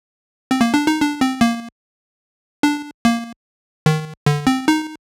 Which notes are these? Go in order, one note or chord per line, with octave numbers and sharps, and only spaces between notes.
C4
A#3
D4
D#4
D4
C4
A#3
D4
A#3
D#3
D3
C4
D#4